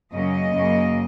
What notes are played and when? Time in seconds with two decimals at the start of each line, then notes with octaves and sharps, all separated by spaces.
0.13 F#2 C#3 A#3 C#4 D#5
0.55 F#2 C#3 A#3